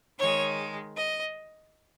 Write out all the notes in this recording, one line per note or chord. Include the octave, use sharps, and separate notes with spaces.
D#3 G#3 C#5
D#5